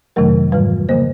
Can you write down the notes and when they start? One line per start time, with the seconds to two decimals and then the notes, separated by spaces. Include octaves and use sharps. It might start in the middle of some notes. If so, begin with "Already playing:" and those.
0.16 F2 C3 D#3 F#3 A3 A#4
0.52 G#2 E3 G3 B4
0.89 C#3 F3 A#3 C5